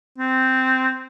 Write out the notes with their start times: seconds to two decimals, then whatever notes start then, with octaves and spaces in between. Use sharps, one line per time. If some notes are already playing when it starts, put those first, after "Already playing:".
0.18 C4